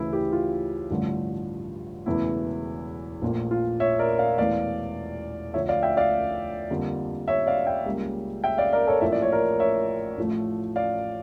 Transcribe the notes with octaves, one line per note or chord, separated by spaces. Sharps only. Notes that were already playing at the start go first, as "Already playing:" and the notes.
Already playing: D2 C#3 E3 E4
E4 G4
F4
A1 G2 D3 F3 A3
E1 E2 C#3 E3 A3 E4
A#1 A#2 A3
F4
C#5 E5
A#4 D5
D5 F5
E1 E2 E3 A3 D5 F5
D2 D3 F3 A3 C#5 E5
D5 F5
E5 G5
D5 F5
F2 D3 G3 A#3
C#5 E5
D5 F5
E5 G5
C#2 C#3 G3 A#3
E5 G5
D5 F5
A#4 D5
A4 C#5
A1 A2 F3 A#3 E5
D5
C#5
A#4 D5
C#5 E5
A1 A2 F3 A3
D5 F5